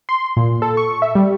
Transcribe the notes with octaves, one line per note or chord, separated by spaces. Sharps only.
C6
A#2
A4
C#6
E5
G3